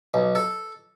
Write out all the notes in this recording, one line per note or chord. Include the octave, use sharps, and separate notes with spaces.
B1
A4